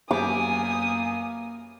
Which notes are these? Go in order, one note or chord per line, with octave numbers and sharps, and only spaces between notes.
F#2 A#3 B3 G4 G#5 D6 D#6